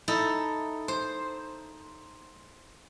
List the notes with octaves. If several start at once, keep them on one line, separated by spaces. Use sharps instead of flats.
D#4 E4 A4
C5